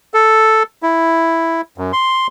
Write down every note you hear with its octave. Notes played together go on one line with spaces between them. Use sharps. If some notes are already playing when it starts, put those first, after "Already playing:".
A4
E4
F#2
C6